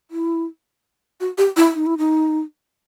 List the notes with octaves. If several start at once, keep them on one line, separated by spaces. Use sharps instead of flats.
E4
F#4
G4
E4
D#4
E4
D#4